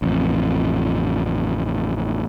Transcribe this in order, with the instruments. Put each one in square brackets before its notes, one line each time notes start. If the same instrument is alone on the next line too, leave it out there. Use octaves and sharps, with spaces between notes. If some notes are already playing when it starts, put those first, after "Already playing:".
[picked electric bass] A1 F2